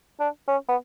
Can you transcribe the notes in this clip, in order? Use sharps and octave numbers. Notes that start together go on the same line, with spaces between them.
D4
C#4
B3